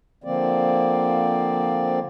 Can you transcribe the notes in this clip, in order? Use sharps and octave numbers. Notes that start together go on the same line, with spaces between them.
D3 F3 A#3 C4 D5